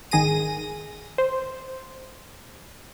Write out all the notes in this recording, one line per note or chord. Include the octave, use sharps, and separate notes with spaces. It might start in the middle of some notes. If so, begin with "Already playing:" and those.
G#1 D#3 G#4 A#6 D#7
C5